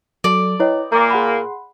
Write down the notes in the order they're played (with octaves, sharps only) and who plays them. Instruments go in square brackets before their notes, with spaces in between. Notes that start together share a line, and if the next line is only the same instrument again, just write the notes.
[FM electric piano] F#3 A4 [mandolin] D5
[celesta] E4 C#5 [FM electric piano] B4 D#5 G5
[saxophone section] A#2 A#3 [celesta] A#5 D6
[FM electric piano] G#4 F#5 C6 [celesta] B5